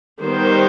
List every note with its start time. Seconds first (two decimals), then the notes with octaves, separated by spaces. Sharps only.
0.22 D#3 G3 B3 C5